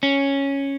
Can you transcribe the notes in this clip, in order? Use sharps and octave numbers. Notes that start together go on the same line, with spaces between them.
C#4